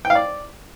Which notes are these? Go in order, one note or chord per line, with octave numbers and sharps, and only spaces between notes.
G5
F5
D5